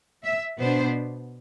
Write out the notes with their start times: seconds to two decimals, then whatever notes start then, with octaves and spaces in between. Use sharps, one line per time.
0.24 E5
0.60 B2 B3 D4 C5